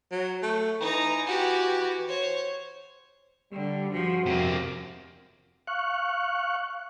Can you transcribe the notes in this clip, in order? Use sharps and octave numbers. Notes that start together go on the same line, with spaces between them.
F#3
A3
E3 D#4 A#5
F#4 G4
C5 C#5
D3 G3
G2 C#3 F3 F#4
F2 C3 A#3
F5 C#6 F#6